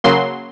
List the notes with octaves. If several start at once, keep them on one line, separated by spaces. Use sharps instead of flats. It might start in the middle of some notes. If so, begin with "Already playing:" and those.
C#3 F#3 A#3 C6